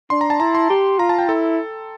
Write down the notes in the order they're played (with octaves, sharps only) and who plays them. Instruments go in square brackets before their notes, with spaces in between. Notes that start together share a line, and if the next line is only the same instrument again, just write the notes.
[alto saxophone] D4 [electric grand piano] C6
[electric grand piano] A#5
A5
[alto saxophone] E4 [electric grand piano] A#5
[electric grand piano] C6
[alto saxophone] G4
[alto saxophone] F4 [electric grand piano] A#5
[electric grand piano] A5
G5
[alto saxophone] E4 [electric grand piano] A4